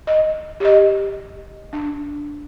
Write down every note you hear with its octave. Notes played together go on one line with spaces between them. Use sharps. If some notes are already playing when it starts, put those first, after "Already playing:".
D#5
G4 D#5
D4